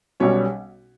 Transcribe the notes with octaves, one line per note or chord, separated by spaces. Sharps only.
B1 B2 G3 C#4 C#5